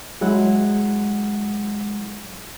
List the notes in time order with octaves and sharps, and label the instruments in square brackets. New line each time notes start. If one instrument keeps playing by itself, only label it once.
[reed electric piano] F#3 G#3 E4 F#5